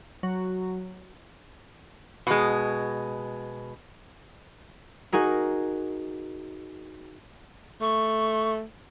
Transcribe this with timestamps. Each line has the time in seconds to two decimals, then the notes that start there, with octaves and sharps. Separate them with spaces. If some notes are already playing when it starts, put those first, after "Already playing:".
0.23 F#3
2.27 B2 G#3
5.12 D#4 F#4 G#4 A#4
7.81 A3 C#6